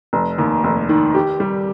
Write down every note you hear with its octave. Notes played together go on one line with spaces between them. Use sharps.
F1
D#2
F1
D#3
G4
G3